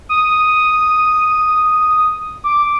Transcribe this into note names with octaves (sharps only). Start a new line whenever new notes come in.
D#6
D6